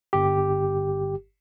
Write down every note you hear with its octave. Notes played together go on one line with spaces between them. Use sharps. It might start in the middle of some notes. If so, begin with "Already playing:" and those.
G1 G4